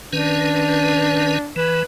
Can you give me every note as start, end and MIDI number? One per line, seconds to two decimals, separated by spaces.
0.13 1.38 51
0.13 1.38 61
0.13 1.51 62
0.13 1.38 71
1.56 1.83 52
1.56 1.82 71